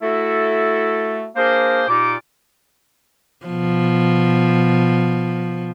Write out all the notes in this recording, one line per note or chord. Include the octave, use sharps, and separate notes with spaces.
A3 E4 F#4 A4
A#3 D4 G#4 A#4 C5
A#2 D#4 F4 G4 D5 D6
B2 F3